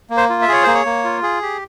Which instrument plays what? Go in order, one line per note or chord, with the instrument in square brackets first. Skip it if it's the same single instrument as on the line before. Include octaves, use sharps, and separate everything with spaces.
[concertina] A#3
C5
F4
E5
G#4 C#5
A#3 C5
C#5
A#3
F4
G#4
G4